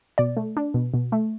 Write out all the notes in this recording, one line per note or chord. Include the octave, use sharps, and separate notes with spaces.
B2 D5
A3
D4
B2
B2
A3